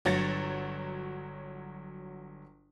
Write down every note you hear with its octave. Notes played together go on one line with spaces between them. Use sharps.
G1 F#3 C#5 A6 A#6 C#7